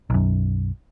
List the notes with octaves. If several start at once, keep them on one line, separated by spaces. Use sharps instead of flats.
B1 F#2